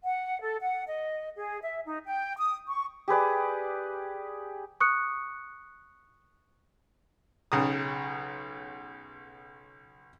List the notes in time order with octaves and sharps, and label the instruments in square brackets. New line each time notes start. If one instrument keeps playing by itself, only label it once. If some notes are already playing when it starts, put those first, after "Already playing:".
[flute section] F#5
A4
F#5
D#5
G#4
E5
D#4
G5
D#6
C#6
[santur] G4 G#4 B4 D5
[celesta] C#6 D#6 F#6 C#7
[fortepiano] B1 C#3 A#5 D#6